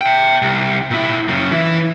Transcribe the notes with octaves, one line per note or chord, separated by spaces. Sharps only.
E5 G5
C2
A#2 E4
F#2 C#3
E3 E4